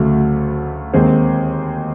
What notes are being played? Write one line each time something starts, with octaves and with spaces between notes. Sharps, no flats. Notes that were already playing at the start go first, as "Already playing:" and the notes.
Already playing: D2 C#3 F#3 A3
D#2 D#3 G#3 C4